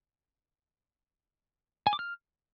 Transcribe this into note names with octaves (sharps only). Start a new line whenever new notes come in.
G#5
D6
F6